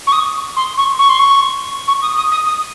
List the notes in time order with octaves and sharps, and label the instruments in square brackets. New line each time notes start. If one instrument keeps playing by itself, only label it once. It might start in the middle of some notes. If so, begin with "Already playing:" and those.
[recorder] C#6
D#6
C6
C#6
C#6
C6
C#6
C#6
D#6
D#6
D#6
D#6